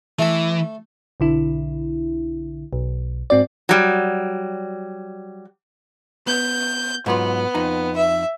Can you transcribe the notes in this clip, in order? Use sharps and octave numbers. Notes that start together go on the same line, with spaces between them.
E3 A3 A4
B1 D3 E4
B1
G#2 C4 F#4 D5
F#3 G3
B3 G6
G#2 F#3 B3 F4
F2 D#4 A#5
E5